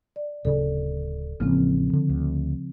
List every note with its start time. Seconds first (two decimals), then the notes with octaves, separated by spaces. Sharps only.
0.16 D5
0.45 D1 C#3 A4 D5
1.40 A1 C#3 F3 A#3 C4 C#4
1.93 D3
2.09 D2